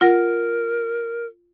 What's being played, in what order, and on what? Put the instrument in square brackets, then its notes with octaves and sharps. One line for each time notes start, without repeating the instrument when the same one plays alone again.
[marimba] F4 F#5 A#6 [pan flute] A#4